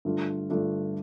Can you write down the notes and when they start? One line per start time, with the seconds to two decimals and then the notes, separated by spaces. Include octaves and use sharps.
0.05 G2 D3 A3 D4 F4
0.49 G2 D3 A3 D4 F4